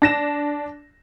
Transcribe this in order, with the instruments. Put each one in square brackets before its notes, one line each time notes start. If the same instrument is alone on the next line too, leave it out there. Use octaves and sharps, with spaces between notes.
[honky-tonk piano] D4 A#6 E7